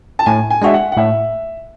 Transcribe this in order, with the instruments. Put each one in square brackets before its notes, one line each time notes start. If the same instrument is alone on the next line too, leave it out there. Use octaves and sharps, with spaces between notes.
[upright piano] A5
[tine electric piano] A2 [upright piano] G#5
[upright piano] G#5
[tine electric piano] G#3 D4 F#4 [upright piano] E5
[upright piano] F#5
F#5
[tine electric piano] A2 [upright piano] E5